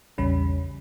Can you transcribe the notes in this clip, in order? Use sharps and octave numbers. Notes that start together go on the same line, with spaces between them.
A#1 E2 C#3 G3 C#4 B5